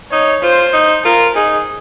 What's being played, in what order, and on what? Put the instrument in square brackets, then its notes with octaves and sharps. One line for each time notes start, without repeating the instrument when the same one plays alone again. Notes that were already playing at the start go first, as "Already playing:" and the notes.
[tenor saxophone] D#4 [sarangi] C#5
[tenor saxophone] F4 [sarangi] C5
[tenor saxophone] D#4
[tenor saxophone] F4 [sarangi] A#4
[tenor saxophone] D#4 [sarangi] G#4